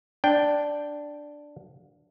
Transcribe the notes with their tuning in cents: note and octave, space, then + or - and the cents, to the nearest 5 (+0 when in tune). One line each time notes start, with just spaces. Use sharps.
D4 +0 G5 +0